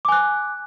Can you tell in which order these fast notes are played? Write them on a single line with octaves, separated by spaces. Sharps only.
D6 G#5 F#6